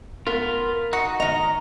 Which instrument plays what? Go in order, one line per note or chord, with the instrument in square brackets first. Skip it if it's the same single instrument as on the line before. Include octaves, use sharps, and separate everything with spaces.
[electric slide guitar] B3 F4 [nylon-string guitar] A#4
[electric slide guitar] D#4 F#4 [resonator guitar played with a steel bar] F#5
[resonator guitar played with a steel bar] D#3 A#5 [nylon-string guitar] D#5